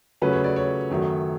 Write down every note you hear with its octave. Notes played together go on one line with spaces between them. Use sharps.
C#3 F#3 A3 C#4 B4
C#5
D5
C#5
F#2 D#3 F#3 A3